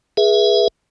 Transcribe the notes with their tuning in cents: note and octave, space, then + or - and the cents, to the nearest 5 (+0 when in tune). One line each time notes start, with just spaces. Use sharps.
G#4 +0 B4 -35 E5 +0